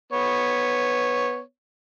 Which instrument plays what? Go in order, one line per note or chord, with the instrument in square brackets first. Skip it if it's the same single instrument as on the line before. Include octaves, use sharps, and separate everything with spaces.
[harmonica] B3 C#5